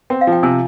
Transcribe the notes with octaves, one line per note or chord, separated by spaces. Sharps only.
C4 G5
F5
F3
G5
C3 G#5